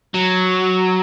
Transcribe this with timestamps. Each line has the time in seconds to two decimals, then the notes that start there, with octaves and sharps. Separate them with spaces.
0.14 F#3